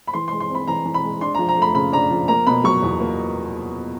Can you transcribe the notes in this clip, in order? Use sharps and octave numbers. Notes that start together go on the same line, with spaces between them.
B5
E3 C6
C6
G#3
C6
C4 B5
E3 A#5
E3
B5
G#3
D4 C6
F3 A#5
A#5
A3 B5
C#3 B5
D4 A#5
F3
A#3 A#5
B2 B5
F#3 C#6
E2
A#3